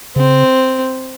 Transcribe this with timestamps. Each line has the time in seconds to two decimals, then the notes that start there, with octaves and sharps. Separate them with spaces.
0.16 C#3 C4